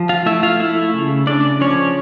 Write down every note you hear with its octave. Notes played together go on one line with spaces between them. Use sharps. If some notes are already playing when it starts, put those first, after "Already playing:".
Already playing: F3
F4 F5
A3 E4 E5
F4 F5
A3 E4 E5
C#3
C#3 D4 D5
F3 C#4 C#5